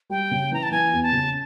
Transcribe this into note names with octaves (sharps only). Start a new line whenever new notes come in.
G3 G5
C#3
E3 A#5
A5
E3 G#5
E2
A5
C#3